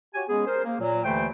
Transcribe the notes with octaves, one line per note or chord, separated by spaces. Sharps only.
F#4 G4 C#5 G#5
G#3 B3 C#4 G#4
A#4 C5
A#3
A#2 F#3
D#2 D3 E3 A3 C5 G5